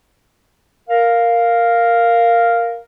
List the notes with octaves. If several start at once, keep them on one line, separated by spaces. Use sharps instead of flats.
A#4 F5